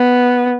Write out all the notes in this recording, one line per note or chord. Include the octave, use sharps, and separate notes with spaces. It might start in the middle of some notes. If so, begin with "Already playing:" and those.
Already playing: B3